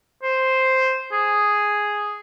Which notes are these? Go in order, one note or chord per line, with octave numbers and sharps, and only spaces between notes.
C5
G#4